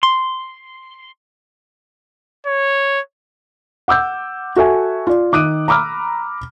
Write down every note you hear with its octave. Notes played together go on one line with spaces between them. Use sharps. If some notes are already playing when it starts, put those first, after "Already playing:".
C6
C#5
F#5 D6 E6 G6
F#4 A4 E5 G#5
F4 D5
D#3 D6 D#6 F#6 D7 D#7
A#5 B5 D6 E6 F6